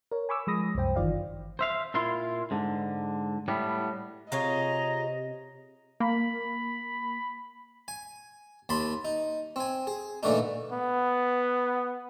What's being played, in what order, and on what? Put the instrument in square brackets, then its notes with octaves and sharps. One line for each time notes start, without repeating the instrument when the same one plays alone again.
[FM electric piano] A#4 C#5
G#5 B5 C#6 D6 E6
F3 G#3 B5 D#6 A#6
C2 F#2 C5 G5
G1 D#3 E3 F4 D5 F5
[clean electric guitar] C5 E5 F5
A#2 E4 F4 C6
G#2 D3
A2 G3 B3
[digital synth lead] C3 [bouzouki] F4 G#4 C#5 [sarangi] D#5 [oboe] A#5
[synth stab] A#3 [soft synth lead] B5
[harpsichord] G#5
D#2 A5 B5 C6
D#4
C4 G#5
G#4
A#2 D3 E3 A3 D4 D#4
[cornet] B3